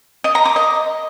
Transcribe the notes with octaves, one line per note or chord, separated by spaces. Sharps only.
D#5
A#5
D6
D#5